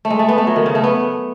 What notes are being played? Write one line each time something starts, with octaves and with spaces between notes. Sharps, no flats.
A3
G#3
A3
B3
A3
F#3
D#3
C#3
A3
B3